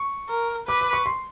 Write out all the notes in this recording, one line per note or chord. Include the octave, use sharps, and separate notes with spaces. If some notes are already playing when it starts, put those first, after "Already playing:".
Already playing: C#6
A#4
B4 D6
D6
C#6
C6